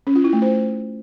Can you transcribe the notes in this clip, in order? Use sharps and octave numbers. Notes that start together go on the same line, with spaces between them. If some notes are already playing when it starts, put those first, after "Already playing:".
C#4
F4
E4
A3
C5